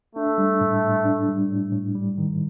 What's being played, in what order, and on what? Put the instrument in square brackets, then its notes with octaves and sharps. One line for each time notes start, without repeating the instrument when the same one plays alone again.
[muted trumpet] A3 [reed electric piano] D4
[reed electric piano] G3
A2
A2
D4
G3
A2
A2
G3
D#3